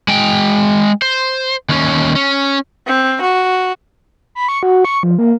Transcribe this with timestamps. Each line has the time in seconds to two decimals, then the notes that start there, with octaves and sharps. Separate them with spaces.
0.08 G#3 G5
1.02 C5
1.69 D#2 C#4
2.16 C#4
2.87 C4
3.21 F#4
4.35 B5
4.48 C#6
4.63 F#4
4.85 C#6
5.03 F3
5.18 A#3